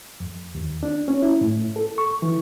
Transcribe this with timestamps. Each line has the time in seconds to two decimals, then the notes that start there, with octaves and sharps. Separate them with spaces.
0.20 F2
0.55 D#2
0.83 D4
1.08 C#4
1.22 E4
1.41 A2
1.76 A4
1.98 C#6
2.22 E3